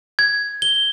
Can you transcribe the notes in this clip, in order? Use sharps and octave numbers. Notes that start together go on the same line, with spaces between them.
G#6
G7